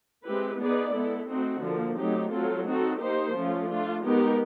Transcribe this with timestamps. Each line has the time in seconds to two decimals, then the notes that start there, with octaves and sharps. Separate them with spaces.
0.25 G#3 C4 E4 G4 B4
0.59 B3 D#4 G#4 B4 D5
0.93 G#3 B3 E4 A4
1.28 A3 C4 D#4 F#4
1.62 D3 F3 A#3
1.96 F#3 A3 C4 D#4 G4
2.31 F#3 A3 C4 F4 A4
2.65 C4 D#4 F#4 A4
2.99 A#3 D#4 G4 C5
3.34 F3 A3 C#4 F4
3.68 A3 D4 F4
4.02 G#3 B3 D#4 G4 A#4